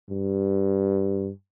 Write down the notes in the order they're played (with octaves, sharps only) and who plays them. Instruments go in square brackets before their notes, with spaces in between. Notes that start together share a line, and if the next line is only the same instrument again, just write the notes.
[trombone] G2